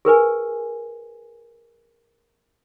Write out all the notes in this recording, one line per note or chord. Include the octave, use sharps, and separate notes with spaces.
G#4 A#4 B4 G#5